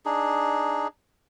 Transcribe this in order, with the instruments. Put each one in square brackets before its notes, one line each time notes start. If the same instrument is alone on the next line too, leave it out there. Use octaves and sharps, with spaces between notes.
[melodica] D4 D#4 G#4